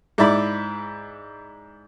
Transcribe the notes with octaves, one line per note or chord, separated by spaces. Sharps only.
G#2 E4 D5 B5